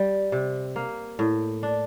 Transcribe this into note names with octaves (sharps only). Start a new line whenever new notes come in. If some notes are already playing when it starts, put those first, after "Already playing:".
Already playing: G3
C3
A#3
A2
D4